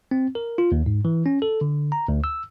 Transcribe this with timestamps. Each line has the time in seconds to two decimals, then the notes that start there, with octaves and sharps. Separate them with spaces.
0.11 C4
0.35 A#4
0.58 F4
0.72 D#2
0.86 G#2
1.05 E3
1.26 C#4
1.42 A4
1.61 D3
1.92 A#5
2.08 D2
2.24 E6